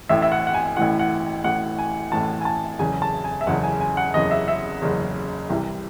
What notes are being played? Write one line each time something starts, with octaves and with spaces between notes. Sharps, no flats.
A1 A2 E3 E5
E5
F#5
F#5
G#5
A1 A2 E3 F#5
F#5
A1 A2 E3 F#5
G#5
A1 A2 E3 A5
G#5
A5
F#1 E2 C#3 G#5
A5
G#5
E5
F#1 E2 C#3 F#5
G#5
G#5
F#5
F#1 E2 C#3 D#5
E5
E5
F#1 E2 C#3
C2 C3 E3